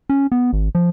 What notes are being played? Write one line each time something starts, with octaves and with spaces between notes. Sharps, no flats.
C#4
B3
G#1
F3